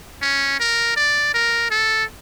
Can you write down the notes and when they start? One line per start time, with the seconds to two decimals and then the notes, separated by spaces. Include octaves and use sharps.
0.22 C#4
0.60 A#4
0.96 D5
1.34 A#4
1.71 A4